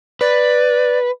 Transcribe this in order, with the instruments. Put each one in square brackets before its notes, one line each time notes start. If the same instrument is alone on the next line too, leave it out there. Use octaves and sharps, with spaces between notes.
[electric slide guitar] B4 [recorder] D5